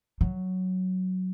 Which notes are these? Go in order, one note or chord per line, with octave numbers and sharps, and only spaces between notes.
F#3